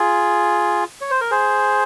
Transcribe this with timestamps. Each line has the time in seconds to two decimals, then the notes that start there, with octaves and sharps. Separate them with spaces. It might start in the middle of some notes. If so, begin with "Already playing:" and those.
Already playing: F4 G#4
1.01 C#5
1.11 C5
1.21 A#4
1.31 G#4 C5